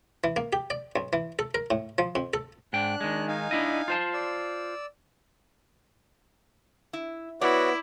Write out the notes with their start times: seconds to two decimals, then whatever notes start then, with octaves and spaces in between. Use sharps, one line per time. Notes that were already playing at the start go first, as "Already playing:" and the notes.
0.24 E3
0.36 A#3
0.53 G4
0.70 D5
0.96 B1
1.13 E3
1.39 A4
1.55 A#4
1.71 A2
1.98 F3
2.15 F2
2.34 A4
2.73 G#2 D4 G5 F#6
3.01 D#3 G#3
3.28 D#4 F5 G#5
3.51 D4 E4 D#5
3.88 F4 C5 A5
4.14 D5 E6
6.93 E4
7.41 B3 E4 F#4 C#5 D5